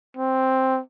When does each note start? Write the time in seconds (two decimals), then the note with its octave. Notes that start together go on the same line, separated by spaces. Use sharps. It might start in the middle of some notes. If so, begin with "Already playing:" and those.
0.17 C4